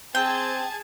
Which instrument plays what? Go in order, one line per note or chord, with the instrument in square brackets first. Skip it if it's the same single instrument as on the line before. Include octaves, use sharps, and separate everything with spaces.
[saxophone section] C4 [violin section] G#4 A5 G#6 [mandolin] G5